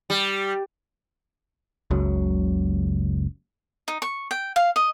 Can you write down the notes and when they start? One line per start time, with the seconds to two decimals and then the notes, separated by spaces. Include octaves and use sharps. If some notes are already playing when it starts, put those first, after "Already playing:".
0.10 G3
1.91 F#1 C#2 F#2 F#3
3.88 D#4
4.02 C#6
4.31 G5
4.56 F5
4.76 D#5